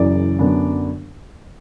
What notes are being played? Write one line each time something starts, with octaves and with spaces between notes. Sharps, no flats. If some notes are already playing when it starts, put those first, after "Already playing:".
Already playing: F#1 F#2 C#3 E3 D5
F#2 D3 F#3 B3 D4